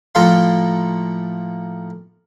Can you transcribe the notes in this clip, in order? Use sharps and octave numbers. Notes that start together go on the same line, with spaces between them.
A2 F3 A#3 A4 F5 C6